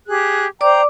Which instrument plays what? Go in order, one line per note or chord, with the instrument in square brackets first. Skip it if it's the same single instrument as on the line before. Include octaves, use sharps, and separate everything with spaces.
[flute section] G4 G#4 F#6
[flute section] C5 G5 A#5 [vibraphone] D5 D6